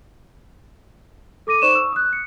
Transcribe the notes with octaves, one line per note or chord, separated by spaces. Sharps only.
A4 D6 A#6 D#7
D#4 C5 D5 C#6 E7
C#6 E6
D#6 F#6
C#7